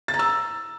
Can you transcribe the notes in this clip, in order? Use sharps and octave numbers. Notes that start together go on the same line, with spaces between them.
A6
A#5
E6